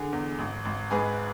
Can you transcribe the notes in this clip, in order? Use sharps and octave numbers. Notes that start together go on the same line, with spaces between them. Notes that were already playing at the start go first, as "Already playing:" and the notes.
Already playing: D3 G#4
E2
G#1
G#1
G#2 G#4 B4